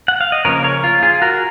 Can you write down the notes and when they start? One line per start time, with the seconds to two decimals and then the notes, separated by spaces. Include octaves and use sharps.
0.08 F#5
0.21 F5
0.32 D#5
0.45 C#3 F3 A#3 C#4 A#4 C#5
0.64 A#4 C#5
0.84 F4
1.03 F4 G#4
1.22 F#4 A#4